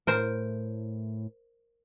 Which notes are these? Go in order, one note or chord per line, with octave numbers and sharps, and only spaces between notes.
A2 A#4 C5